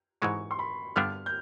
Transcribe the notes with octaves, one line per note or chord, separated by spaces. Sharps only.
G#2 E3 G#3 C#6
C6
B5
G2 D3 G3 B3 D4 F6
G6